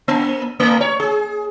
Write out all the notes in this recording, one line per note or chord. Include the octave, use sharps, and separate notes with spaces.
A#3
A3
C#5
G#4